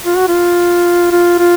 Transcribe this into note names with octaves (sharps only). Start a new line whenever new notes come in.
F4
F#4
F4
F4
F4